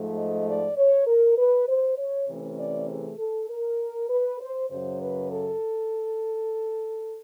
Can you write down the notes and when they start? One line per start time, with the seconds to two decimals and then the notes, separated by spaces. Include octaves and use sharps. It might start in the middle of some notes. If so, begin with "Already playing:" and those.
Already playing: G#2 F3 A3
0.17 D#5
0.47 D5
0.77 C#5
1.07 A#4
1.37 B4
1.68 C5
1.98 C#5
2.28 C3 E3 A3 C#4
2.58 D5
2.89 G#4
3.19 A4
3.50 A#4
4.10 B4
4.41 C5
4.70 F#2 C#3 F#3 C5
5.01 B4
5.31 A4